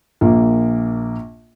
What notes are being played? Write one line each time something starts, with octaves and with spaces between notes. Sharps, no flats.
A#1 A#3